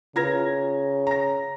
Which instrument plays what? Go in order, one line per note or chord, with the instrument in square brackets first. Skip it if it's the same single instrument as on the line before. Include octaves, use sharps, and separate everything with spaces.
[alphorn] C#3 [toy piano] F4 B4 [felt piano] A#5 G#6 A#6
[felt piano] A#5 A#6